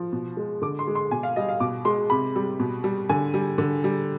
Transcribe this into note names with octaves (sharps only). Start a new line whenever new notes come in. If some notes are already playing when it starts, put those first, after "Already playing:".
Already playing: F3
B2
G#3
D3 D6
C6
G#3
C6
B2 G#5
F5
G3 D#5
F5
B2 D6
G#3 C6
C3 B5
G3
B2
G3
D3 G#5
G3
D3
G3